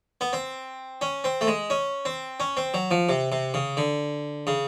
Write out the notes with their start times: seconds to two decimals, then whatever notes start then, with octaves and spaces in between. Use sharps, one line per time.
0.21 B3
0.33 C4
1.01 C#4
1.24 C4
1.41 A3
1.47 G#3
1.70 C#4
2.05 C4
2.40 C#4
2.57 C4
2.74 F#3
2.91 F3
3.09 C3
3.32 C3
3.54 C#3
3.77 D3
4.47 C#3